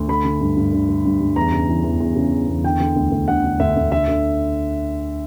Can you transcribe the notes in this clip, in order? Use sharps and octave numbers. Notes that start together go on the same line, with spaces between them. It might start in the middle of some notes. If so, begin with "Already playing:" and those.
Already playing: D2
D3 B5
D3
G2
G2
D3
D3
G2
G2
E2 A#5
C#3
E3
E2
E2
C#3
E3
E2
D3 G5
D3
D2
D2
D3 F#5
D3
D2 E5
D2
D3 E5
D3